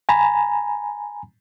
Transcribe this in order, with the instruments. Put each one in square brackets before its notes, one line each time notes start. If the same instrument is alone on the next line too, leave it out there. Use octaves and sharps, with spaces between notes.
[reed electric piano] G#5 A#5 B5